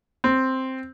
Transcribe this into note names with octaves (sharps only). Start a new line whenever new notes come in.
C4